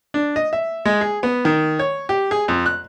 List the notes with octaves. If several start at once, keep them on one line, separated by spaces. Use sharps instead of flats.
D4
D#5
E5
G#3
G#4
B3
D#3
C#5
G4
G#4
F2
F#6